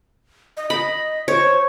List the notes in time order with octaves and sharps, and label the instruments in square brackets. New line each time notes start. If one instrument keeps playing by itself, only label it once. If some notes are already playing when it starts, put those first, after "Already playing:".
[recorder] D#5
[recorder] D#5 [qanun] B5
[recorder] C5 [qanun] C#5